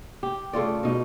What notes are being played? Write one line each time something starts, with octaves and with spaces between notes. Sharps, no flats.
G4
C#3 A3 F4 D5
B2 D#4